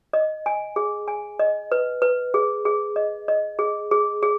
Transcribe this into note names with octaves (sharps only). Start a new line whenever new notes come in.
D#5
G#5
G#4
G#5
D#5
B4
B4
G#4
G#4
D#5
D#5
G#4
G#4
G#4